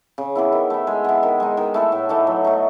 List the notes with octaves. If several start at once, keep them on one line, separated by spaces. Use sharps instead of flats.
C#3
E3 B3 E4
D#3
A3 E4
G#3
B3 E4
D#3
G#3 D#4
D#3
A3 E4 A4
A2
E3 A3 D#4
F#3
A3 D#4